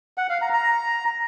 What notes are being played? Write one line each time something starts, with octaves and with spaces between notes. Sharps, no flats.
F#5
F5
A#5
A#5